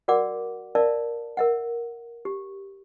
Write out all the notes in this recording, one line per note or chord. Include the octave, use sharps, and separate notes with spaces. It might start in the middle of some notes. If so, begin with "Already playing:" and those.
F#4 A#4 D5 F#5 D6
A#4 D5 E5 F5 A5
A#4 E5 F#5
G4